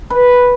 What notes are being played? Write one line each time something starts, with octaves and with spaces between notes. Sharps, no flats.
B4